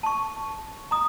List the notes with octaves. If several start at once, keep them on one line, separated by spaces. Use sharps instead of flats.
A5 C#6
A#5 D#6